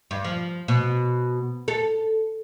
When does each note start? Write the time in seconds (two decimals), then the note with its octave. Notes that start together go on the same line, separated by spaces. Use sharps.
0.11 G2
0.24 F3
0.68 B2
1.68 A4